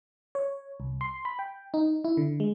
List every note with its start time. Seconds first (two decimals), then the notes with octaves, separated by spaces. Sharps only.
0.35 C#5
0.80 C2
1.01 C6
1.25 B5
1.39 G5
1.74 D#4
2.04 E4
2.17 D3
2.40 G#3